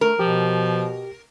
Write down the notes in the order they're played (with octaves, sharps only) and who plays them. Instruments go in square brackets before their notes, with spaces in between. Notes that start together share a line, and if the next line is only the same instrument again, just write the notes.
[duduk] A3 [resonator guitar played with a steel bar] A#4
[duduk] B2 [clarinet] F3 [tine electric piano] G4